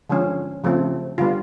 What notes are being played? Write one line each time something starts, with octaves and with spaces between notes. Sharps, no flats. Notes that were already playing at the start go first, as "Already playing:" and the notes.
D3 F3 G#3 C#4
C#3 F3 A3 C4
D3 G3 B3 F4